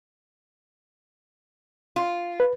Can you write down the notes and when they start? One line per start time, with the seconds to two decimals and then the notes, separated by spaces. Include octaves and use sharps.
1.96 F4
2.40 B4